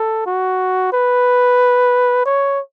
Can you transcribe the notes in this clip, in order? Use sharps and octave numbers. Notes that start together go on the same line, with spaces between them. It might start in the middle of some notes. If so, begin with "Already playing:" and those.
Already playing: A4
F#4
B4
C#5